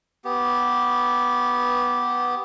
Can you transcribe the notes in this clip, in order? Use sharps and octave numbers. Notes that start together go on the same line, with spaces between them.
B3 G4